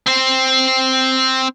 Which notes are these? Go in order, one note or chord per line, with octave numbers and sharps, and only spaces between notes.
C4 C5